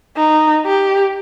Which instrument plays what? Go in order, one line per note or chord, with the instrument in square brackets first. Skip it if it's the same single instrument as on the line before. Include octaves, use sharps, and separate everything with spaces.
[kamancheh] D#4
G4